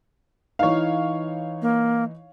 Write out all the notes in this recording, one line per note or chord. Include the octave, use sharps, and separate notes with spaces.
E3 D#4 C#5 F5
A#3